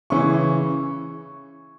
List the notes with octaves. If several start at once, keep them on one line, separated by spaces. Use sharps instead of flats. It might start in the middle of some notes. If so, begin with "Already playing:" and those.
C#3 E3 C#4 E4 C#6